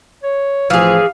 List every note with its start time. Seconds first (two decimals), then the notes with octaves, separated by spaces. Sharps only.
0.23 C#5
0.70 A1 E3 F3 G#4 F5